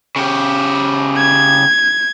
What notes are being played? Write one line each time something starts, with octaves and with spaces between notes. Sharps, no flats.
C#3 G4
G#6